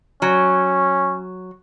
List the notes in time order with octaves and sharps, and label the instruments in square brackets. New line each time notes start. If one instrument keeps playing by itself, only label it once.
[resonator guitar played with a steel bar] F#3 [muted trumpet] C#4